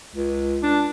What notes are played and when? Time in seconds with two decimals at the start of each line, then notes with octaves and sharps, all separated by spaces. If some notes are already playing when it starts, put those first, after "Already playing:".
0.16 C#2
0.63 D4